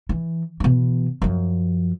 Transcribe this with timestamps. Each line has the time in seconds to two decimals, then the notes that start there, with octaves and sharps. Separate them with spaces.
0.09 E3
0.60 B2 E3
1.22 F#2 F3